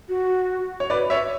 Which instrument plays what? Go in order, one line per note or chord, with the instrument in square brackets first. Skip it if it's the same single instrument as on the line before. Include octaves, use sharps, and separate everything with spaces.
[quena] F#4
[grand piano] C#5
B4 D5
C#5 E5